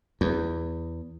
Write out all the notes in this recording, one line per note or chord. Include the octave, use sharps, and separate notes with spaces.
E2